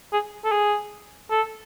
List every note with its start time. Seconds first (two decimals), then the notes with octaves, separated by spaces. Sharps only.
0.13 G#4
0.44 A4
0.52 G#4
1.30 A4